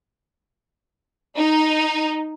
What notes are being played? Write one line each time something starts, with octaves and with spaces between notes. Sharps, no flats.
D#4